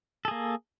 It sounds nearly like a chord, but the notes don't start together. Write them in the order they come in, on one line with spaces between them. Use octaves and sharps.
A4 G#4 A#3